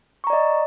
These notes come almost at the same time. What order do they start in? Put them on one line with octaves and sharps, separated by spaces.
C#6 A#5 D5 D#5